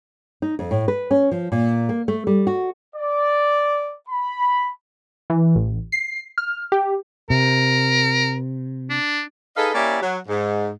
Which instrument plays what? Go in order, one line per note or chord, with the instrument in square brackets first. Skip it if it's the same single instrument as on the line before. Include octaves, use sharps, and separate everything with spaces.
[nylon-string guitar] D#4
F2
A2
B4
C#4
F3
A#2
A#3
A3
G3
F#4
[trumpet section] D5
B5
[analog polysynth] E3
A1
C7
F6
G4
[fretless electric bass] C3 [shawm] A#4
[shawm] D4
[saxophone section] D#4 G#4 A4 B4 D#5 F5
A#3 C#4 E4 G4 D5
F#3
G#2